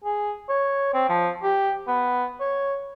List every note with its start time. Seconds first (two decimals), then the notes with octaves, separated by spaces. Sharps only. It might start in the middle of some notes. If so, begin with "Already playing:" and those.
0.04 G#4
0.49 C#5
0.94 C4
1.09 F3
1.43 G4
1.88 B3
2.41 C#5